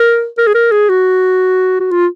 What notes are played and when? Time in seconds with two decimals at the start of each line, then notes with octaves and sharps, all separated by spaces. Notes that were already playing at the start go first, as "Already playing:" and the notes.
Already playing: A#4
0.38 A#4
0.47 G#4
0.55 A#4
0.72 G#4
0.89 F#4
1.80 F#4
1.91 F4